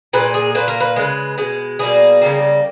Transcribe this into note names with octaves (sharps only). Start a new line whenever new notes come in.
A#2 G#3 B4
G#4
A#2 A#3 B4
A#4
B4
C#3 G#3
B2 G#3
B2 G3 A#3 G#4
C#3 G3 A#3